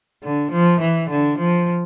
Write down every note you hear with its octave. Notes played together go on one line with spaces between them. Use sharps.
D3
F3
E3
D3
F3